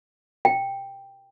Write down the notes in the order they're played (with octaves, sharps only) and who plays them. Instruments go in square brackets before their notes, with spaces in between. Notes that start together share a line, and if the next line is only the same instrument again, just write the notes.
[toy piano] G5